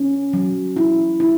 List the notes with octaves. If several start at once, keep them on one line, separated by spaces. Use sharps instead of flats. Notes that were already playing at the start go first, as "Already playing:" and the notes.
Already playing: C#4
F#3
E4
E4